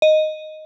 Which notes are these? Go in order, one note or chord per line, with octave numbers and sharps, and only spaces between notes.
D#5